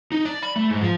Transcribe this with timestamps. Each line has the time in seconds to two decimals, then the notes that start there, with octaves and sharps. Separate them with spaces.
0.12 D#4
0.25 D5
0.43 B5
0.56 A3
0.70 G#2
0.82 F3